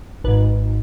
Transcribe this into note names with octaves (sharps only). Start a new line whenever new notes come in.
G#1 G#2 B4